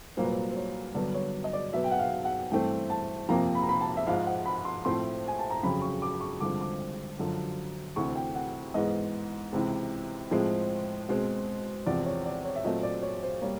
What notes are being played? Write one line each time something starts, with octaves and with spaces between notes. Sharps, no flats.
C2 A#2 F#3 A#3 C5
B4
C5
C5
C#5
G2 D3 F#3 B3 D5
C#5
D#5
D5
B2 F#3 B3 E5
G5
F#5
F5
F#5
G2 E3 A3 C4 G5
A5
F2 C3 F3 A#3 A#5
B5
A#5
B5
A5
E5
G#2 F3 G#3 F5
F#5
B5
C6
A2 F3 A3 C4 C6
G#5
A5
A#5
F2 C#3 F#3 B5
C#6
D6
C#6
G2 D3 F3 G#3 C4 D6
D6
F#2 D3 F3
D2 C3 E3 C#6
G5
F#5
G#2 E3 G#3 B3 D#5
C#2 C3 E3
A2 F3 G#3 C4
B2 G#3 C4
E2 C3 F3 D5
C#5
D5
C#5
E5
A#2 F#3 A3 C4 D#5
D5
C#5
C5
G3 A#3 C#5